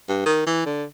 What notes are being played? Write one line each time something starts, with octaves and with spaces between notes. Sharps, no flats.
G2
D#3
E3
D3